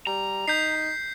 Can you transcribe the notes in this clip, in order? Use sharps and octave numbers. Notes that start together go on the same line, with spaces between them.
G3 A#5
D#4 G6 B6 C7